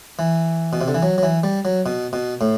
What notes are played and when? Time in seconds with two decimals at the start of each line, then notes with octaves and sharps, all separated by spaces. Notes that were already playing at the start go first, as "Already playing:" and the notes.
0.19 E3
0.73 B2
0.81 C3
0.88 D3
0.94 E3
1.03 F#3
1.18 F#3
1.23 E3
1.44 G3
1.65 F#3
1.86 B2
2.13 B2
2.41 A2